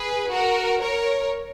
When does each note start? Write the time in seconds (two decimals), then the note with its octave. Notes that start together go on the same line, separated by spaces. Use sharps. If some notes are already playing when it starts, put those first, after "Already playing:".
Already playing: G#4 B4
0.30 F#4 A#4
0.80 A#4 C#5